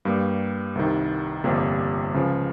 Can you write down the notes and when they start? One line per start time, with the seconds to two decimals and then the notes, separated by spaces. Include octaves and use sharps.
0.05 G2 G3 A#3
0.75 C2 C3 D#3
1.44 G1 F2 C3 G3 A#3
2.14 C#2 C#3 F3